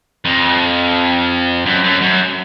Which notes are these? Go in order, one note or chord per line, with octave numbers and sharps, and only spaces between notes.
F2
F#2
F#2
F#2